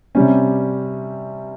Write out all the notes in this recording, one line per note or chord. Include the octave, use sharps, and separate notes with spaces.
C3 G3 C#4